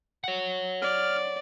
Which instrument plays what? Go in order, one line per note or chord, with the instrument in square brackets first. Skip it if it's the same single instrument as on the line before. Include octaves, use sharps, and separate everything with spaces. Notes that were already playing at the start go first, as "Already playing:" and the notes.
[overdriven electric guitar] C#5 F#5
[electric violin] D5 [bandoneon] F6